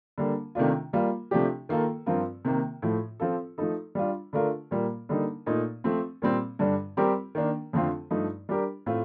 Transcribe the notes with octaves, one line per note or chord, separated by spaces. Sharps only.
D3 G3 A#3
C3 D#3 A3 D4 F4
G3 A#3 F4
C3 F3 A3 D4 G4
D#3 A#3 F4 A4
G2 F3 C4 F4 A#4
C3 D#3 A#3
A2 F3 A3
F3 C4 F4 A4
F3 A3 D#4 A4
G3 D4 F4
D3 A3 D4 F4 A#4
A#2 G3 A#3
D3 G3 A#3 D#4
A#2 A3 D#4
F3 A3 C4
A#2 G3 C4
G2 D3 G3 D4
G3 C4 G4 A#4
D#3 A#3 D4
F2 D3 A3 C4 F4
G2 F3 A3 D#4
G3 D4 G4 A#4
A2 A3 C4 F4